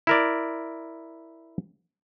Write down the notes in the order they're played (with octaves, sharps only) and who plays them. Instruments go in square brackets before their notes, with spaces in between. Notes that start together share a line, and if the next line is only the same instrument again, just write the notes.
[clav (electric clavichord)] E4 A#4 D5